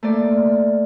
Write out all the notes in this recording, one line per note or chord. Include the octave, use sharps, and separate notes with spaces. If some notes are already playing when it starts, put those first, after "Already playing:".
A3 A#3 D5